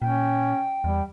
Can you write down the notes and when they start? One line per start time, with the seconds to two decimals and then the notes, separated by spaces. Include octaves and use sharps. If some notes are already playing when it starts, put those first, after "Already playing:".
0.02 A#2 C#4 G5
0.84 E2 G3